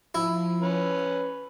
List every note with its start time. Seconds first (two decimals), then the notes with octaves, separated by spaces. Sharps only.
0.15 F3 E4
0.62 C#4 B4